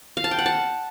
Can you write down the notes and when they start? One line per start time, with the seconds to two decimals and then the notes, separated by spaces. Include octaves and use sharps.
0.17 F5
0.24 A5
0.31 G5
0.39 F#5
0.46 A5